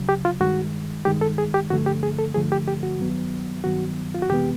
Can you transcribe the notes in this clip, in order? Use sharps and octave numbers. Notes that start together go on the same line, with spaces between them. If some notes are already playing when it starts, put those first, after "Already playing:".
Already playing: D2 C#3 F#3
G4
F4
G2 D#3 G#3 F#4
G2 D#3 G#3 G4
A4
G#4
G4
G2 D3 F3 A3 F#4
G4
G#4
A4
G2 D3 F3 A3 G#4
G4
G4
F#4
G2 D#3 F#3 B3
G2 D#3 F#3 B3 F#4
F4
F#4
F2 C3 E3 G#3 B3 G4